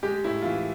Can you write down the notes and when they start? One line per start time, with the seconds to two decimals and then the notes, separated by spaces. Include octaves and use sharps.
0.03 G#3 G4
0.24 A2 E4
0.42 F4
0.45 E3 E4